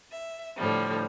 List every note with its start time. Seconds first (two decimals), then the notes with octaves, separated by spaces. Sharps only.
0.11 E5
0.56 A2 D3 F3 G3